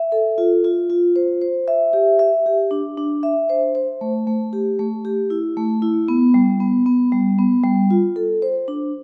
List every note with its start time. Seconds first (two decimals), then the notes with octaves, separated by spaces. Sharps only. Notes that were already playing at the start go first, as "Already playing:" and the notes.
Already playing: E5
0.12 A4
0.38 F4
0.64 F4
0.90 F4
1.16 C5
1.42 C5
1.68 E5
1.93 G4
2.19 E5
2.46 G4
2.71 D4
2.98 D4
3.23 E5
3.50 C5
3.75 C5
4.01 A3
4.27 A3
4.53 G4
4.79 A3
5.05 G4
5.30 E4
5.57 A3
5.82 E4
6.08 B3
6.34 G3
6.60 B3
6.86 B3
7.12 G3
7.38 B3
7.64 G3
7.90 F4
8.16 A4
8.42 C5
8.68 D4